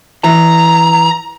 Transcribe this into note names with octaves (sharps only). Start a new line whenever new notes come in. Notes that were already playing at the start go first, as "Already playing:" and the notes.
E3 A#5